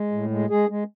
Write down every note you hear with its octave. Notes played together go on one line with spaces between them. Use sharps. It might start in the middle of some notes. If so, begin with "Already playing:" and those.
Already playing: G#3
A2
G#3
G#3 G#4
G#3